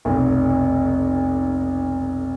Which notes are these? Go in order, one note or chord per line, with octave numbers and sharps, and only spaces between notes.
F1 B1